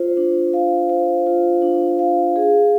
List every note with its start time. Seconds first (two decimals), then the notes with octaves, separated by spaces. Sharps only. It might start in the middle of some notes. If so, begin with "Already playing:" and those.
Already playing: F4 C5
0.17 D4
0.54 F5
0.89 C5
1.27 F4
1.62 D4
1.99 F5
2.36 G#4